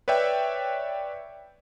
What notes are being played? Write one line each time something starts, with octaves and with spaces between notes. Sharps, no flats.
B4 C#5 D5 E5 G5